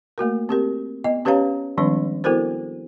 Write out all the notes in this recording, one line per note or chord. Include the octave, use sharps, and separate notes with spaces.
A3 A#3 F#4 A#4
C4 G4 A#4
B3 D#5
C#4 G4 B4 C#5 F5 A#5
D#3 F3 G3 G#3 C4 D4
B3 E4 F#4 A4 A#4 C5